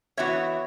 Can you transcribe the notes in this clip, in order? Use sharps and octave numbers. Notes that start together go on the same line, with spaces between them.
E3 B3 F#4 C#5 E5